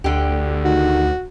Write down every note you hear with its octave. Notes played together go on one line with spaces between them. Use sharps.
D2 D3 G4
D#3 F#4